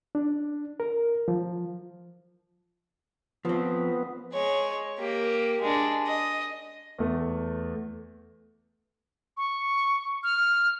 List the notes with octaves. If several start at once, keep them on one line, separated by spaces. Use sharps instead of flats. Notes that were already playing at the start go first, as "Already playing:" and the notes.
D4
A#4
F3
F3 B3 C4
G#3 C#5
A#3 G4
G#3 D4
D#5
E2 A3
C#6
F6